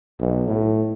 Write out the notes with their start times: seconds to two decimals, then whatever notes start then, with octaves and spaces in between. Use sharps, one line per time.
0.19 B1
0.48 A2